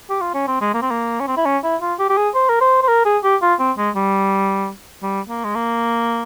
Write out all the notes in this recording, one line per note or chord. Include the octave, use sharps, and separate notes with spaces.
G4
F4
C#4
C4
G#3
A#3
C4
A#3
C#4
C4
E4
C#4
E4
F4
G4
G4
G#4
C5
A#4
C5
C5
A#4
G#4
G4
F4
C4
G#3
G3
G3
A#3
G#3
A#3